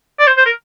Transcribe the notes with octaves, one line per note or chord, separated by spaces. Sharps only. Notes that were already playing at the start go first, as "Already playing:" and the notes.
D5
C5
C5
A#4